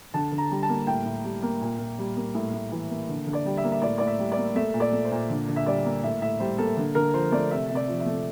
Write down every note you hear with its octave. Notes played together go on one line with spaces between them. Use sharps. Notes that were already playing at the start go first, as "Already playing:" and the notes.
D3 A5
D3
A#5
G3
A5
A#3
A2 G5
A2
G3
A#3
A#2
A#2
G3
A#3
A2
A2
E3
A#3
D3
D3
D5
G3
E5
A#3
E5
A2 D5
A2 D5
E5
G3
D5
A#3
A3 E5
A#2
D5
A3
C5
A#2
D3
D3
E5
G3 D5
A#3
A2 E5
A2 E5
G3 C5
A#3 A4
D3 A4
D3 A#4
F3 C5
A3 D5
C3 E5
C3
D5
F3
E5
A3